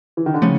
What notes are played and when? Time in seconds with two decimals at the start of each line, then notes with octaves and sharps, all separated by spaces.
0.17 E3
0.26 D#3
0.34 D3
0.42 C#3 F3 A3 C#4